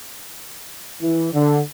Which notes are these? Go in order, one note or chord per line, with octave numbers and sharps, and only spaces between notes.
E3
D3